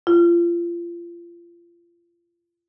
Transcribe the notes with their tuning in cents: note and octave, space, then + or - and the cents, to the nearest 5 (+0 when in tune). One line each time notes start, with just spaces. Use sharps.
F4 -30